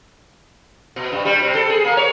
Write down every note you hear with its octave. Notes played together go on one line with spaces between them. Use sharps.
B2
G2
G3
C3
A4
G#4
A#3
C#5